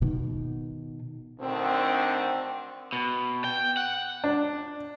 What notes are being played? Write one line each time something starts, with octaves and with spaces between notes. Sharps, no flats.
B2 D#3
D2 D3 D#3 C4
B2
G5
F#5
D4